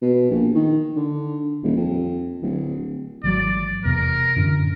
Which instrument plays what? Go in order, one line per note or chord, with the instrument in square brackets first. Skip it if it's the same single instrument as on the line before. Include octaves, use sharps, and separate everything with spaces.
[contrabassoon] B2
A#1
D#3
D3
D#1
F2
D1
[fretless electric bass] G#1 E3 F#3 [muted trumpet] D5
[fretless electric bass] E1 E2 C3 [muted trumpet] A#4
[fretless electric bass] F#2 A2 D3